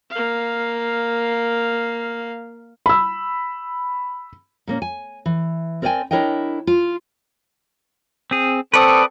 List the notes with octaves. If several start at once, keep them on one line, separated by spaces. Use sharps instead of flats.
A#3 F5
B5 E6
A#2 A#3 C#4
G#5
E3
C4 A#4 D5 D#5 G5 G#5
D4 E4 A#4 C#5 D#5 G5
F4
C4 G#4
C4 A4 B4 D5 C#6 D#6